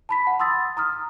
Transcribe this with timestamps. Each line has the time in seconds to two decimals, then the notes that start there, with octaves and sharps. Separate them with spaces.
0.09 A5 B5 B6
0.27 F#5
0.40 C6 D#6 E6 A6
0.77 A#5 D#6 F6